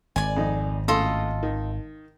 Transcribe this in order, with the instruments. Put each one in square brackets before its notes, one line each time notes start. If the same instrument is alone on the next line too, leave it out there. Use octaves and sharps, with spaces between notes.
[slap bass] G#1 [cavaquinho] D5 G#5
[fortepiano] F2 D#4
[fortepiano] C#2 A2 [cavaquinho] F4 A4 D#5
[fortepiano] D#3